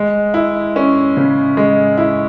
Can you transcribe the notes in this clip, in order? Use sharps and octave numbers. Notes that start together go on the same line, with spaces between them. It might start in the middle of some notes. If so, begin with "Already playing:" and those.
Already playing: G#3
E4
C#4
C#3
G#3
E4